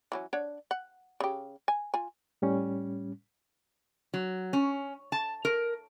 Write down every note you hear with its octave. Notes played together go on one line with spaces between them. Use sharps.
E3 F#3 C#4
D4 C#5 F#5
F#5
C#3 G4
G#5
F4 G#5
A2 G3 C#4
F#3
C#4
A5
A#4